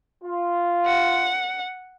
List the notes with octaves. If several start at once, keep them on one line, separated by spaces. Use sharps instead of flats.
F4
F#5